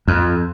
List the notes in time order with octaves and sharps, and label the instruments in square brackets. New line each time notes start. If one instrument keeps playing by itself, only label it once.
[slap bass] F2